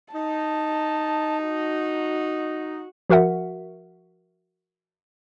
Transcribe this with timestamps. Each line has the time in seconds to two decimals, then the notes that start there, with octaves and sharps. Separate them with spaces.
0.14 D#4 A5
1.46 F#4
3.10 F3 F#4 A#4 E5 F#5